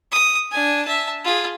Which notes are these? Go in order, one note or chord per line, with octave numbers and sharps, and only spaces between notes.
D#6
D4 G#5
E5 A5
F4 G#4